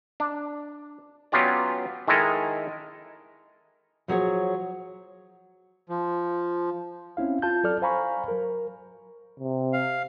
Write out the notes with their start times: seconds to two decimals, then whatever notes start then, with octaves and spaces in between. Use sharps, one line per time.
0.20 D4
1.32 F#3 B3 C#4 F4 G4 D5
2.08 D#3 G#3 E4 A4 A#4 D#5
4.08 F3 F#3 G#4 C#5
5.89 F3
7.17 C4 C#4 E4 F5
7.42 F4 A5 G6
7.64 F#3 A4 D5 F6
7.82 C5 F5 G#5 A#5 B5 C#6
8.28 F#3 A#4
9.40 C3
9.73 F5